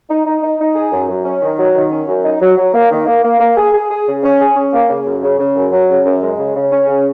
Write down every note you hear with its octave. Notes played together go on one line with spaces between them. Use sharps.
D#4
D#4
D#4
D#4
G#4
F#2
F#2
C#4
D#3
F#3
D#3
C#4
F#2
D#4
F#3
F#3
A#3
D#3
A#3
A#3
A#3
G#4
G#4
G#4
C#3
C#4
G#4
C#4
A#3
C#3
F#2
C#3
C#3
F#2
F#3
C#3
F#2
G#3
C#3
C#3
C#4
C#3